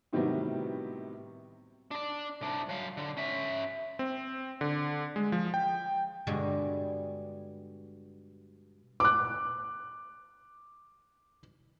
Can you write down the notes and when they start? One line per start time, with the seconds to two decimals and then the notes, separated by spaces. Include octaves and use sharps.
0.13 A2 C3 D#3 F#3 G3 B3
1.91 D4 D5
2.41 C2 D4
2.69 F#3 F5
2.97 D3
3.17 C#4 E5
3.99 C4
4.61 D3
5.16 G#3
5.32 F3
5.54 G5
6.27 G2 B2 D3 G3 G#3 G#4
9.00 D6 F#6